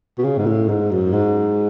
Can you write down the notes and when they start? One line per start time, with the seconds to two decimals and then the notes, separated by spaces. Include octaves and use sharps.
0.18 B2
0.24 C#3
0.38 G#2
0.46 A2
0.69 G#2
0.91 F#2
1.13 G#2